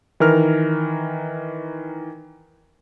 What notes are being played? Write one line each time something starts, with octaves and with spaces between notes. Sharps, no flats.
D#3 E3 A#4 F6